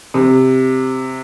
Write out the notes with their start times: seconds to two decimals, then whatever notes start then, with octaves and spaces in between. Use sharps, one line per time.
0.14 C3